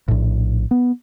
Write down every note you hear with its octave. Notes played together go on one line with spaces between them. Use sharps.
A#1 A2
B3